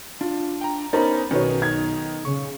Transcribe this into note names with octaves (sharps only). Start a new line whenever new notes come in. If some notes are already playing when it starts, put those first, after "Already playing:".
D4 F4
G5 A#5
B3 C#4 D#4 A#4 C5 D5 A#5 B5
B1 D#3 C#4 D#4 F#4 B4 C#5
D#4 G#6
C#3 C#6